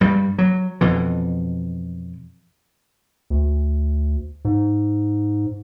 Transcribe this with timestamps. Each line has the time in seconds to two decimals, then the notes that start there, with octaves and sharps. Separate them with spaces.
0.01 G2 G3
0.38 F#3
0.81 F2 B2 E3
3.30 D2
4.45 G#2